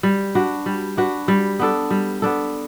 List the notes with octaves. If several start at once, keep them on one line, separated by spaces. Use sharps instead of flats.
G3
D4 F#4 B4
G3
D4 F#4 B4
G3
B3 D4 A4
G3
B3 D4 A4